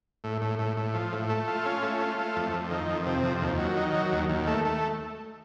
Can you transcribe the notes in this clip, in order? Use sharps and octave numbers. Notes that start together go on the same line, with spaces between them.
A2
A2
A2
A2
F3
A2
A3
F4
C#4
A3
F4
A3
F2
F2
D#3
F2
C3
F2
D#2
F#3
D#3
F#3
D#2
D#2
A3
A3